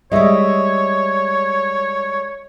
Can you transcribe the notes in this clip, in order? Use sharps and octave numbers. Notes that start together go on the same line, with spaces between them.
G3 G#3 C#5 D#5 E5